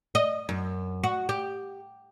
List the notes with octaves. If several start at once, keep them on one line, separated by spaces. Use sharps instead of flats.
D#5
F#2
F#4
G4